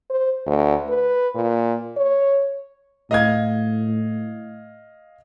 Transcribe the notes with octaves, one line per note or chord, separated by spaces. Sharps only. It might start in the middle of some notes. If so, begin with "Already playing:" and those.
C5
D2
B4
A#2
C#5
A2 D#5 F5 G#6